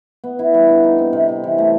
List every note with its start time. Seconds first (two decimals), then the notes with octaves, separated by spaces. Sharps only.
0.24 B3
0.39 E4
0.54 G3
0.69 D3
0.84 D#4
0.98 C4
1.13 C3
1.29 C3
1.44 E3
1.58 A3